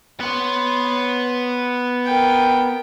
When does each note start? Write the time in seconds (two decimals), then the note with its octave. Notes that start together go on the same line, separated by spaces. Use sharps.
0.21 B3 C#5 C6
2.05 A#4 G5